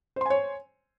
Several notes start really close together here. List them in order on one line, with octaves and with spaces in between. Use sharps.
C5 C6 G#5 C#5